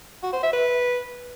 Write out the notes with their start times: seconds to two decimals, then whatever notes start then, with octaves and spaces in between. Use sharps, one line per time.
0.23 F#4
0.33 C5
0.43 E5
0.53 B4